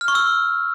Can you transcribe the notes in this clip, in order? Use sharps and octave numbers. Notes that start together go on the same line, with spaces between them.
F6
C#6
E6